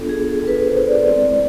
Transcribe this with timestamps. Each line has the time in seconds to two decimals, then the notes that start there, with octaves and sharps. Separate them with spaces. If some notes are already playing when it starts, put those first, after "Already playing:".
Already playing: B3 D4 F4 A4
0.09 G#4
0.29 A4
0.47 B4
0.67 C5
0.87 D5
1.06 G#3 C4 E4 D5